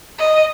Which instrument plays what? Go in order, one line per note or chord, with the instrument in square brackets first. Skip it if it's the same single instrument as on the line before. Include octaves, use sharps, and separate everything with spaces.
[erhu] D#5